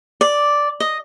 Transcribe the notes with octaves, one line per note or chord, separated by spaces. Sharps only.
D5
D#5